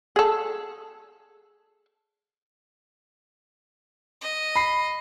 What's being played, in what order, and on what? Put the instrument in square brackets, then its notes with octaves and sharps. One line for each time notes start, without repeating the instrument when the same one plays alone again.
[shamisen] G#4 A4
[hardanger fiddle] D#5
[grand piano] B5 C7